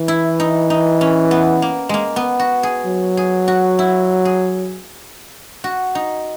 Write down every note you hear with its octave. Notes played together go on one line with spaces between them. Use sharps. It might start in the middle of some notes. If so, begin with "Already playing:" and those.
Already playing: E3
E4
D#4
D#4
C#4
B3
A#3
G#3 A#3
B3
F#4
G#4
F#3
G#4
F#4
E4
G#4
F#4
D#4